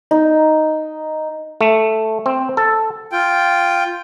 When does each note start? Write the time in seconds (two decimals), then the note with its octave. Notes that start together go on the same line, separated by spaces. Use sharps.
0.11 D#4
1.61 A3
2.26 C4
2.57 A4
3.11 F4 G5